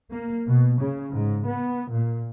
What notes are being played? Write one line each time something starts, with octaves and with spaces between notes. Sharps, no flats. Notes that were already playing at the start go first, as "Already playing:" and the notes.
A#3
B2
C#3
G#2
B3
A#2